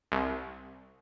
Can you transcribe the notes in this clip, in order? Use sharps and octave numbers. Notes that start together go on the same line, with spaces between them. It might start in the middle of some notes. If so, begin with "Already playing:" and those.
C2